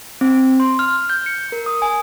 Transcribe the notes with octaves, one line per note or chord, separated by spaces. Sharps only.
C4
C6
F6
G6
C#7
A#4
D#6
G#5